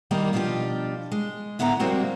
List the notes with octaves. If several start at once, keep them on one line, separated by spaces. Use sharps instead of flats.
D#3 G3 A#3 D#4
B2 F3 D4 F4 G4
G#3
A2 D3 B3 E4 F#5 A#5
F3 G3 G#3 A#3 C4 F#4